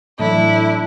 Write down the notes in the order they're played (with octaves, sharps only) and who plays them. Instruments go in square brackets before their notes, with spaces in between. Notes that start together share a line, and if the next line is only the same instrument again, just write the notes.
[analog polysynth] A2 [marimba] E3 F#3 D5 [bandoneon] D4 [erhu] E4